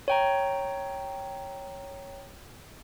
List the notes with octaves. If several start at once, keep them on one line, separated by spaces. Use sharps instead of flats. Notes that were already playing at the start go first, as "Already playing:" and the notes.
C#5 G5 A#5